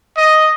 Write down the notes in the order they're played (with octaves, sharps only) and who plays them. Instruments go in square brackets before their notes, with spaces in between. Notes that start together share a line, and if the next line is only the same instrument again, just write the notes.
[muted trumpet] D#5